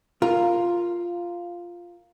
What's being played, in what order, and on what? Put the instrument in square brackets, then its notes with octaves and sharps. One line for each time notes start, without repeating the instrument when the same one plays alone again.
[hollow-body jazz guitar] F4 A#4